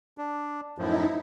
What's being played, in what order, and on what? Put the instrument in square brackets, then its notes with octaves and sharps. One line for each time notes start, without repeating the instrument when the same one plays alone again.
[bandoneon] D4
[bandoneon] F#2 A2 F3 [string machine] D#4 E4